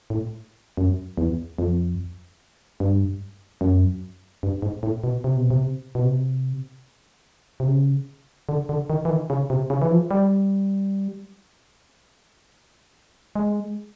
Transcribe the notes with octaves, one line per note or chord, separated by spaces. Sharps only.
A2
F#2
E2
F2
G2
F#2
G2
G#2
A2
B2
C3
B2
C3
B2
C3
C3
C#3
D3
D3
D#3
E3
D#3
C#3
C3
C#3
E3
F3
G3
G#3